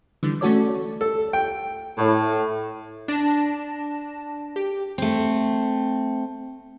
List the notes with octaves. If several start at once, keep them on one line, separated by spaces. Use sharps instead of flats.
D3 E3 G3
A3 C#4 F#4 A4 C#5 D5
A4
G5
A2
D4 A5 A#6 E7
G4
A3 C4